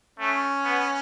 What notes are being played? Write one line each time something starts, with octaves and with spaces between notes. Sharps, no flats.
A3 C#4
B3